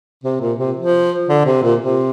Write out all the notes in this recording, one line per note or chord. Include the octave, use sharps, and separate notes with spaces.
C3
A#2
C3
F3
D3
C3
A#2
C3